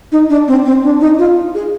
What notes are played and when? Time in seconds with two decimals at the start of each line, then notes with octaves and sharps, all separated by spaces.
0.12 D#4
0.30 D4
0.48 C4
0.65 C4
0.84 D4
1.01 D#4
1.19 F4
1.55 G#4